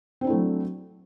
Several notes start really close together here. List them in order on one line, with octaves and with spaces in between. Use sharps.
C4 D4 E4 A3 F#3